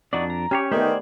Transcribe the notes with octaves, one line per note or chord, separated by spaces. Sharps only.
F2 D4 D#4 F#4 D5
A#5
C#4 G4 C5 C#5
D#3 A3 B3 D#4 G4 C5 D5 G#5